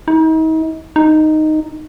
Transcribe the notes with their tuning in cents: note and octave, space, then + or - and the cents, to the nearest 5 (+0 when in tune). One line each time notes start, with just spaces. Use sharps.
D#4 +40
D#4 -5